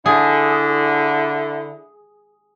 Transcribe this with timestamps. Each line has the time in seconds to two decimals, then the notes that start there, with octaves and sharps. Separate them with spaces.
0.06 D3 E4 G#4